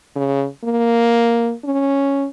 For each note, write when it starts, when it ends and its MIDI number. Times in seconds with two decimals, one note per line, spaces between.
0.16 0.46 49
0.64 1.53 58
1.64 2.27 61